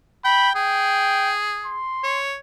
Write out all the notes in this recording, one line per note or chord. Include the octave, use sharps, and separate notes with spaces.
G5 B5
G#4 G5
C6
C#5